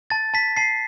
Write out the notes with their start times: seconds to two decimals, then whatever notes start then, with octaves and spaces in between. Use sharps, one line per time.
0.10 A5 A6
0.34 A5 B6
0.57 A5 C7